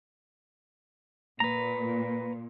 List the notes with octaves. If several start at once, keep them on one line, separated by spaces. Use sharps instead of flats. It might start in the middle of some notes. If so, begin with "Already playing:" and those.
A#2 B4 A#5